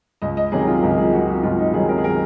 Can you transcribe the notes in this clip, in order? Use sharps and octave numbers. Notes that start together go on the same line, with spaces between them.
C#2 D#5
D#5
C3 D#3 F#3 G#4
F4
C#2 A#4
G#4
C3 D#3 F#3 F#4
F#4
C#2 F4
D#4
C3 D#3 F#3 G#4
A#4
G#4
A#4